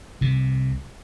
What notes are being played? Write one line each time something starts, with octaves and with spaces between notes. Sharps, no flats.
C2 C3